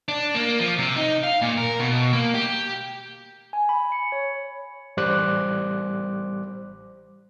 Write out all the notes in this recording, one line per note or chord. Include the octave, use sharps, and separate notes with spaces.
D4
A#3
F3
C3
D#4
F5
A#2
A#4
B2
A#3
G4
G#5
B5
C#7
C#5
A1 G3 C5 D6 F#6